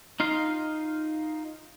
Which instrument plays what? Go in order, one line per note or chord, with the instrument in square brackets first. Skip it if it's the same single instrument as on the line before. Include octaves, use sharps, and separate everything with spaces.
[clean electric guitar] D#4 F4 F5